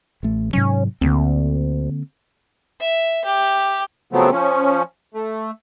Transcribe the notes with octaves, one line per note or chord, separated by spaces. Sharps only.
A1 A3
G#2 C3 F#3 C#4
D2 D3 A#3 C4
E5
G4
C#3 F3 F#3 A3 B3 C4
F3 C#4
A3